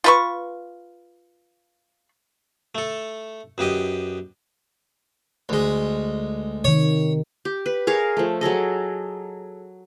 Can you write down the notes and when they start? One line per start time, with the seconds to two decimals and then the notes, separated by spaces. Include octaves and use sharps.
0.04 F4 B4 C#6
2.75 A3 A4
3.58 F#2 B3 G4 D#5
5.49 D2 G#3
6.64 C3 D#3 C#5
7.45 G4
7.66 B4
7.87 G#4 A#4 C#5 F5
8.17 F3 A3
8.41 F#3 G#4 A4 D#5